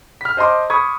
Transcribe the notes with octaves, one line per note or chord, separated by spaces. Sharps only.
F6 B6
C5 D#5 A5 C6 D6
B5 C#6 D#6 G#6